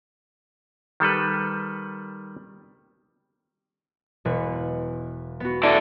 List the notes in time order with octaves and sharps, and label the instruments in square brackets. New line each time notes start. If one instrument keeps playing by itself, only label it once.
[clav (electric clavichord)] D#3 G3 A4 B4
[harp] E1 B4 C#6
B3 F#4
[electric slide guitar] E4 A4 D5